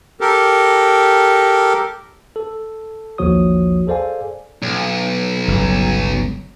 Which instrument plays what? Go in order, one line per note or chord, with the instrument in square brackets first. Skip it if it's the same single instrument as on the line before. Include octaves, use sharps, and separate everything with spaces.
[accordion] G4 A4 A#4
[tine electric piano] A4
A1 D#2 F3 F#4 C#5 D#6
G#4 A4 C5 D5 F5 G#5
[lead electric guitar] B1
[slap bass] G1 C#2 F#3